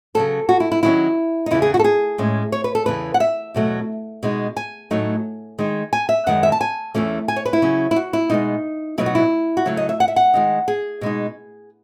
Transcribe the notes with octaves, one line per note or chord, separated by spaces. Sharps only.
C#3 F#3 B3 A4
F#4
E4
E4
D#3 F#3 C#4 E4
D#4
E2 C#3 E3 E4
G#4
F#4
A4
G#4
A2 G#3 C#4
C#5
B4
A4
E2 C#3 E3 B4
F#5
E5
E2 B2 F#3 A3
B2 G#3 D#4
G#5
A2 F#3 A3 D#4
D#3 G#3 D#4
G#5
E5
F#2 D#3 G#3 F#5
E5
A5
G#5
E2 C#3 E3 A3 C#4
G#5
C#5
B4
E4
C#3 F#3 C#4
E4
F#4
E4
B2 G#3 B3 D#4
B2 F#3 B3 D#4 E4
F#4
E4
F#4
C#3 F#3 A3 E4
D#5
E5
F#5
E5
F#5
D#3 G#3 D#4
G#4
B2 G#3 D#4